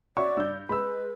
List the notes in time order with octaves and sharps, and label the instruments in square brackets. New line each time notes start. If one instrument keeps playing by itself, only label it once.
[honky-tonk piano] F#4 C#5 E5 [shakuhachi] D5 [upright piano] C#6
[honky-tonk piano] G2 G6 [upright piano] E6
[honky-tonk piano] G#3 [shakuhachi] B4 [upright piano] B5 E6